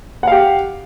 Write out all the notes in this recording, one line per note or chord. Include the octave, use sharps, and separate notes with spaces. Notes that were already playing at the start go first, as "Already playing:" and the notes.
G4 F5 F#5